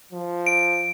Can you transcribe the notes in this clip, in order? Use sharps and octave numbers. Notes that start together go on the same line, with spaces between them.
F3
D7